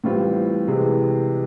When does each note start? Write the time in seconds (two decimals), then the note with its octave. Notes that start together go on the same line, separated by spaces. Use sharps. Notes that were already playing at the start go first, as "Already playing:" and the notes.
0.04 A2 E3 G3 C4 F4
0.68 C3 E3 G#3